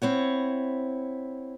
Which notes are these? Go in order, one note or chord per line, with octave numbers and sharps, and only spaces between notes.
C4 E4 C#5 F#5